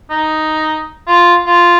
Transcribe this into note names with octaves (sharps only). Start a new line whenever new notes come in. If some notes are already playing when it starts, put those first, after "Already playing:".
D#4
F4
F4